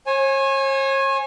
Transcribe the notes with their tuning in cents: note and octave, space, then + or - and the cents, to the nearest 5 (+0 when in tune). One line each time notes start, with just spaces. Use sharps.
C#5 -40 G#5 +0